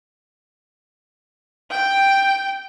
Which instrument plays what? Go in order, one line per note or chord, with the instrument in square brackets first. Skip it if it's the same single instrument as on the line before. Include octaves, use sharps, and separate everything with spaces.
[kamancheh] G5